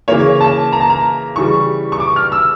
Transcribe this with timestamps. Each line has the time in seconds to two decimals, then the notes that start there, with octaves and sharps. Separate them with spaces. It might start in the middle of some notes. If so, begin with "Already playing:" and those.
0.08 C#3 E3 A#3 C#5
0.41 A5
0.73 A#5
0.80 A5
0.90 A#5
1.36 C#3 E3 G3 C#6
1.92 C#6
2.00 D6
2.16 F6
2.32 E6